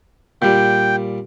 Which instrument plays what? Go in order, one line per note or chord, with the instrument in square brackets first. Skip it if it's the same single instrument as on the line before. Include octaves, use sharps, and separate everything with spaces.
[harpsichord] A#2 G3 [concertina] G5